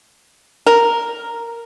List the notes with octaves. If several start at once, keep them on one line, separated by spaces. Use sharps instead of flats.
A#4